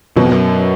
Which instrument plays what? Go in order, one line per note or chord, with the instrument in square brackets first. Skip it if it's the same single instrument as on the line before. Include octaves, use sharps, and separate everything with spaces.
[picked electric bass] F#2 [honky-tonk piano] B2
[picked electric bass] F2
F#2